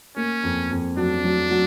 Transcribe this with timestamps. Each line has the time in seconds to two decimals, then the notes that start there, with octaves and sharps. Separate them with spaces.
0.16 A#3 C#4
0.43 F2
0.71 F2
0.97 F#3 D4
1.24 F#3
1.51 F#3